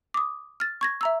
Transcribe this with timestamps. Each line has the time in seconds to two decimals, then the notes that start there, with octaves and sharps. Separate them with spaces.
0.14 D6 D#6
0.60 F6 A6
0.81 C#6 G#6 A#6
1.01 E5 A#5 E6